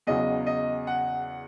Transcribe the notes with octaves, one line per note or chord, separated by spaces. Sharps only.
E2 C#3 F#3 D#5
D#5
F#5